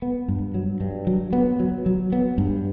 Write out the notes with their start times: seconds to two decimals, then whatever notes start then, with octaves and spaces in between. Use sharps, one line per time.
0.02 B3
0.28 G2
0.54 F#3
0.80 G2
1.07 F#3
1.33 B3
1.60 F#3
1.86 F#3
2.12 B3
2.38 G2